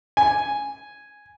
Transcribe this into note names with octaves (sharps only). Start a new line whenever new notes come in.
G#5